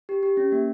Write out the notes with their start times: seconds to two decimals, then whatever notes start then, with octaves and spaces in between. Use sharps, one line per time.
0.09 G4
0.23 G4
0.37 C#4
0.52 A#3